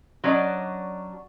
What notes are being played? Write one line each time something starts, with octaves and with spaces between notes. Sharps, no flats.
F#3 C#4 D4 D5 D#5